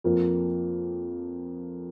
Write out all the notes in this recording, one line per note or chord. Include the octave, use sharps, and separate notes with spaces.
F2 F3 A#3